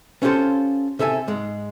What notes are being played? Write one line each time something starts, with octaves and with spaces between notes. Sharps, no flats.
B3 C#4 F4 G4 A4 C5
C3 A4 E5 G#5
G#2 G#3